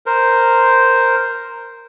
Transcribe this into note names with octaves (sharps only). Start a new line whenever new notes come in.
A#4 C5